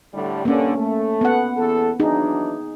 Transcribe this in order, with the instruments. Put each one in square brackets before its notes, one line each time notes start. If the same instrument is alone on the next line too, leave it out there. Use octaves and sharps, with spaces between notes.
[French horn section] A2 D3 G3
[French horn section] G2 D3 [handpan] A#3 C#4
[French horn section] A3
[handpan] B3 F#5
[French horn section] E2 A4
[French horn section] E3 F#3 D4 [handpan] D#4 G#4